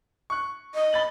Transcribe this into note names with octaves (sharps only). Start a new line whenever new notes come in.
C#6 F#6
D#5
B5 A6 F#7